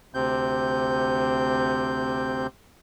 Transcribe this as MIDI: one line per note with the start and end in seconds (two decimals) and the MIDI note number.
0.14 2.47 38
0.14 2.47 48
0.14 2.47 60
0.14 2.47 91